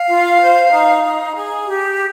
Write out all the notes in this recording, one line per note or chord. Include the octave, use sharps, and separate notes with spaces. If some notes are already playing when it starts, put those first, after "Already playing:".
Already playing: F5
F4
C5
D#4
D#4
G#4
G4